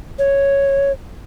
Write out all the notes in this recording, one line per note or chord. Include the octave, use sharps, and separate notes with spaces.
C#5